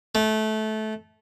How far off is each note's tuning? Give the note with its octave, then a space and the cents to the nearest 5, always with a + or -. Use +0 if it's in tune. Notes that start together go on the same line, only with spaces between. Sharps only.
A3 -20